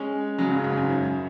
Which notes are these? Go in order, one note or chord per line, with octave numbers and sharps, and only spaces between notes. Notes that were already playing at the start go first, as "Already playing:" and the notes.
Already playing: G#3 C#4
C#3 F#3
G#2 C#3
G#2 C#3
G#2
F#2